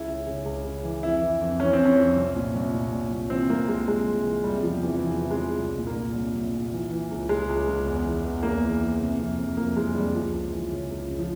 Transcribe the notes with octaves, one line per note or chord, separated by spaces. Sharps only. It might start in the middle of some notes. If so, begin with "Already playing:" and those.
Already playing: C#2 E4
C#3
C#3
C#2
C#3
E3
F2 E4
E3
F2
E3 C#4
C4
F2
C#4
F2
C2
A#2
C2
A#2
A#2
C2
E3 C4
C2 A#3
C2 G#3
C2 G#3
C2
E3
C3 G3
E2 F3
C3 E3
E3
E2 F3
C3
G#3
C3
C2
A#2
A#3
A#2
C2
C2
A#2
E3
E3
C#2
C#2 G#3
C#2
C#2
E2
E3
E2
E2 A#3
E3
E3
C3
F2
F2
F2 A#3
E3 G#3
F2 G3
C#2 F3
C#2
E3
C#3
C#2
C#3
F3